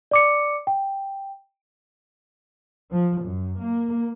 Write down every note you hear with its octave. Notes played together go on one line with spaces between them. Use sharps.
D5 D6 C#7
G5
F3
F#2
A#3